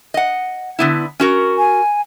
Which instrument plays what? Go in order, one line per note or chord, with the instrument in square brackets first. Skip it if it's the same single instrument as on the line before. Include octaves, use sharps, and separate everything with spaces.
[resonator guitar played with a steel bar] D#5 F#5
D3 B3 E4
C#4 F#4 A#4
[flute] G#5